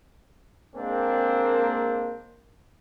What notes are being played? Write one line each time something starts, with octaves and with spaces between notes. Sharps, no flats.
G#3 A#3 C4 D4